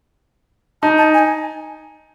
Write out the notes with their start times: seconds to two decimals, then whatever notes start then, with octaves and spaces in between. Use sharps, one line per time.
0.82 D#4 A5
0.98 A5
1.14 G#5